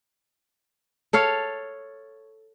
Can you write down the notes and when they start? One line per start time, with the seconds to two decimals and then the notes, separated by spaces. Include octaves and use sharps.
1.13 A4 C#5 F5